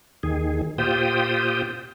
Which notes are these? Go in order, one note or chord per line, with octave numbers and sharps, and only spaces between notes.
D#2 D#3 G#4
A#2 F4 G4 C5 G5 D#6